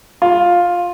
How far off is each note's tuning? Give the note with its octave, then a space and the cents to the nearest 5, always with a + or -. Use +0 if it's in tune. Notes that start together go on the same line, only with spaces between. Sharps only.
F4 +10